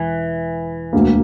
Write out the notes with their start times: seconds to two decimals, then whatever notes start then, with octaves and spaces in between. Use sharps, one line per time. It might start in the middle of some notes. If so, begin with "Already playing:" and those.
Already playing: E1 E3
0.93 E1 D2 D3 A#3